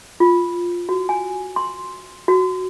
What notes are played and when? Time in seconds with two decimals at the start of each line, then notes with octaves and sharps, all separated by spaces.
0.20 F4
0.89 F#4
1.09 G#5
1.56 C6
2.28 F#4